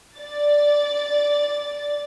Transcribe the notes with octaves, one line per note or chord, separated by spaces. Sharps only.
D5 A6